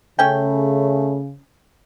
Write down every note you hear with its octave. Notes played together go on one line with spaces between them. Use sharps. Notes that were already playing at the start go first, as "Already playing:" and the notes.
C#3 A3 C#4 G5